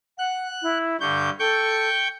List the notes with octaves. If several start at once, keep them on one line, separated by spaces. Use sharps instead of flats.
F#5 F#6
E4
G2 D3 C#6 G6
A4 G5 C#6 G6